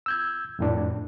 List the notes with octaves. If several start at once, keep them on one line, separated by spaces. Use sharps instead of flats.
E6 G6 G#6
F2 A2 D4